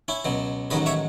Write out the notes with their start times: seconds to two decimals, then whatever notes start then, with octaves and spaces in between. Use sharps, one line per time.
0.08 C#4 E4
0.25 C#2 B2 F#3
0.70 A1 G#2 D#3 F#3 B4 D#5
0.86 C#5 E5